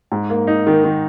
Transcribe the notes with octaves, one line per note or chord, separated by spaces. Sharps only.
G#2
A#3
D#4
D#3
D#3